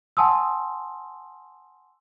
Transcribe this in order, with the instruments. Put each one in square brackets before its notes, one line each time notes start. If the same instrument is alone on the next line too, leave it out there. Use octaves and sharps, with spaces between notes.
[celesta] F#5 G#5 A5 C6 D#6 E6